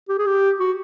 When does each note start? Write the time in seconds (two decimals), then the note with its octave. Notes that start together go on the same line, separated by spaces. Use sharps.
0.09 G4
0.18 G#4
0.27 G4
0.60 F#4